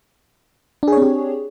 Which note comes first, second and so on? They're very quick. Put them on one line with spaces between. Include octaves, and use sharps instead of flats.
D4 G#4 C#5 C4 G4